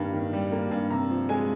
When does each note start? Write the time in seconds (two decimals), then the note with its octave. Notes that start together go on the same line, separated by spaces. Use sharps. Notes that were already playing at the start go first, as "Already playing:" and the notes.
Already playing: G2 D#3 G3 A#3
0.13 D#3
0.33 G3
0.52 A#3
0.71 G2
0.90 C3 A#5
1.10 F3
1.29 G#3 G#5